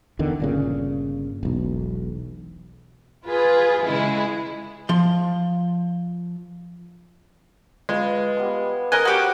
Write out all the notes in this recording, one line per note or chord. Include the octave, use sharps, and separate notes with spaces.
E2 D3 D#3
G1 A#2 C#3
E1 B1
F4 G#4 B4
C#3 G#3 E4
F3 C6
G#3 F4 B4
G3 B3 A5
A#4 D#5 F#5 G#5
F#4 G4 C5 D5